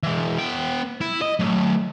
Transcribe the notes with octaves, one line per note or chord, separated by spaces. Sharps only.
E3 G#3
B3 G5
E4
D#5
F#3 A3